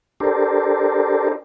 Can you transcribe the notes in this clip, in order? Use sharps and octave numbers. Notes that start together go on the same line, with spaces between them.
D4 G4 A4 A#4 C5 D5